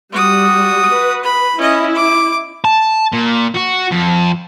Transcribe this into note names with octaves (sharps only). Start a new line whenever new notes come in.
G3 F#4 D#6
B4
B5
C#4 E4 D#5
D6
A5
A#2
F#4
F2